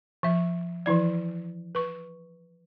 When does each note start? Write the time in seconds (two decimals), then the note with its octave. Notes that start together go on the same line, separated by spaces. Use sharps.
0.23 F3 E5
0.86 E3 F3 E4 D5
1.75 B4 C#6